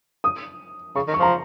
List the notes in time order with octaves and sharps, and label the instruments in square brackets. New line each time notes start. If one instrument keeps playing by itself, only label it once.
[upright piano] D#6
[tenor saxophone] C#3 [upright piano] C#6
[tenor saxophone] D#3
[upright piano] C#6
[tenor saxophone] F3 [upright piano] A#5